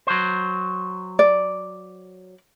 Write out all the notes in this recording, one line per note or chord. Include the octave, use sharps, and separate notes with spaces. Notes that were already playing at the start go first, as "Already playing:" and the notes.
F#3 C5
D5